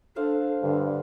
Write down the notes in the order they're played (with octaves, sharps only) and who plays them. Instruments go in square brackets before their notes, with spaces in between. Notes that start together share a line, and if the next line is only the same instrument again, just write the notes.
[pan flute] D4 [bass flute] A4 [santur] C5 F5 F#5
[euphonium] G2 [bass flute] D3